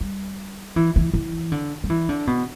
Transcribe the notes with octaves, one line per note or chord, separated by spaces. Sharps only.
G3
E3
E3
E3
D3
G3
E3
D3
B2